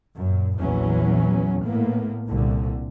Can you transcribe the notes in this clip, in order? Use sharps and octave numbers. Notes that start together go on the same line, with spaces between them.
F#2 A#2
A#1 E2 E3 F#3 C#4
A2 A#3 B3
C2 A#2 D3